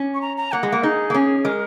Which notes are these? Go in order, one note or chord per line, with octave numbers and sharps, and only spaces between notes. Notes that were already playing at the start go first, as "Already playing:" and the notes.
Already playing: C#4
C#6
A#5
A#5
A#3 F#5
G#3
A#3
D#4 G#4
A#3
C#4
G#3 A#4